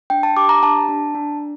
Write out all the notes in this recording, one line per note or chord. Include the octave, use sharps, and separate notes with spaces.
D4 G5
A5
G4 D6
A#5
D4 A5
D4
D4